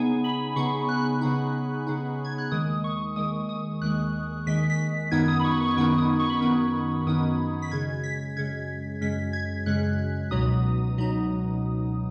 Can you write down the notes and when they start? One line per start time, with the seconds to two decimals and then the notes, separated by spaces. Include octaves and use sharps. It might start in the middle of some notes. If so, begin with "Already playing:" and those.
Already playing: C#3 B3 D#4 G#5
0.24 B5
0.56 C#3 B3 D#4 C#6
0.89 F#6
1.21 C#3 B3 D#4
1.87 C#3 B3 D#4
2.25 G#6
2.38 F#6
2.51 D#2 D#3 G#3 D#6
2.84 C#6
3.16 D#2 D#3 G#3 D#6
3.49 D#6
3.81 D#2 D#3 G#3 F#6
4.46 D#2 D#3 G#3 B6
4.70 B6
5.11 F#2 D#3 B3 D#4 G#6
5.28 D#6
5.40 B5
5.44 C#6
5.60 C#6
5.76 F#2 D#3 B3 D#4 C#6
5.98 D#6
6.20 C#6
6.30 B5
6.39 F#2 D#3 B3 D#4 C#6
7.06 F#2 D#3 B3 D#4 D#6
7.62 B6
7.71 F#2 C#3 G#3 G#6
8.04 B6
8.36 F#2 C#3 G#3 G#6
9.01 F#2 C#3 G#3 B6
9.33 G#6
9.66 F#2 C#3 G#3 F#6
10.31 C#2 B2 F#3 D#4 D#6
10.98 B2 F#3 D#4